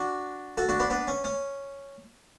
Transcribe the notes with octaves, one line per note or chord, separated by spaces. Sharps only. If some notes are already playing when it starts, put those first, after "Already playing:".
Already playing: D4 F#4
F#4 A4
D4 F#4
B3 D4
B3 D4
C#4
C#4